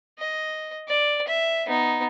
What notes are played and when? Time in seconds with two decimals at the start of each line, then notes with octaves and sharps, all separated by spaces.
0.19 D#5
0.88 D5
1.27 E5
1.66 B3 D#4